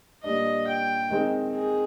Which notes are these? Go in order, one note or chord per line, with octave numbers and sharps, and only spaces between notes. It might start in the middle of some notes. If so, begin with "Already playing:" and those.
A#2 G3 D4 D#5
G5
D#3 G#3 C4 D#4
G#4